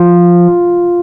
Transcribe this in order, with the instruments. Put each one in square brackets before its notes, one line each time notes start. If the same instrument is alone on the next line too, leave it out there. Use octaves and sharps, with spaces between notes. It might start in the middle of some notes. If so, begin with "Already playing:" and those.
Already playing: [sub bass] F3 [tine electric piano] F4